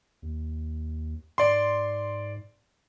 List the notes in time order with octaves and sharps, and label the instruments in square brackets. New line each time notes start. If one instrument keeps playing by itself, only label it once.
[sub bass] D#2
[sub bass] G#2 [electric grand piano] D5 C6